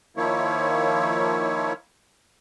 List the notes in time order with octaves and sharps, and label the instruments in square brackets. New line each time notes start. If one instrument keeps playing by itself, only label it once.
[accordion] D#3 F3 A#3 E4 C#5